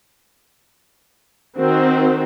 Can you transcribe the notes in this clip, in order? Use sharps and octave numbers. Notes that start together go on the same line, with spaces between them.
D#3 C4 F#4